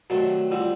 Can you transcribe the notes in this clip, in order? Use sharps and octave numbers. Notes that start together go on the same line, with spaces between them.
C3 D#3 F#3 A3 D4 F#4
D3 G3 C4 F4